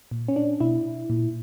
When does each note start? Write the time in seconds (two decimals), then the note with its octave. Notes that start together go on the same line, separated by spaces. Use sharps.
0.11 A#2
0.28 C#4
0.36 D4
0.60 B2 E4
1.10 A#2